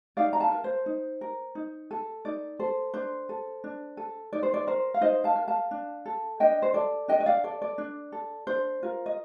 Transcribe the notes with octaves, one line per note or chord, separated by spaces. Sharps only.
D#4 D5 F5
A#5
F5 A5
A#4
C5
D#4
A#4
D#4
A4
D#4 D5
A4 C5
D4 C5
A4
D4
A4
D#4 D5
C5
D5
A#4 C5
F5
D#4 C5 D#5
F5 A5
A#4
F5 A5
D4
A4
D4 D#5 G5
C5
A4 D5
D4 D#5 G5
D#5
D5 F5
A4 D5
D5
D4
A4
D4 C5
F4 A#4
D#5